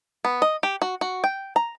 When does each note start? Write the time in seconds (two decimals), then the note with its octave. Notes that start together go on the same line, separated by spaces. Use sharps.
0.25 B3
0.42 D#5
0.63 G4
0.82 F#4
1.01 F#4
1.24 G5
1.56 A#5